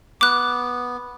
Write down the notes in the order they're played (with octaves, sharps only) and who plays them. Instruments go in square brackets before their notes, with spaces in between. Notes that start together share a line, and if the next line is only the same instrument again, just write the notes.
[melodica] B3 [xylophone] D6 F#6